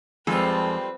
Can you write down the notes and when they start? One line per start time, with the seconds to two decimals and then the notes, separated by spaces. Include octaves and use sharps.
0.27 F2 G3 G#3 C4 F4 A4 B4